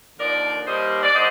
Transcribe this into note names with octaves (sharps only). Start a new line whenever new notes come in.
D#2 D3 F3 A#4 D5
D#2 D#3 G3 C5 D#5
D5
D3 G3 C5 D#5